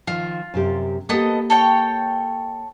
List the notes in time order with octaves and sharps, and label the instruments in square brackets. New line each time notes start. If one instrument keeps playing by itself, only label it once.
[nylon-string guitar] D#3 F3 [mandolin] F4
[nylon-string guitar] F#2 C3 G4
[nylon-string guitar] A#3 G4 [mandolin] B3 A4 D#5
[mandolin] A4 C#5 G5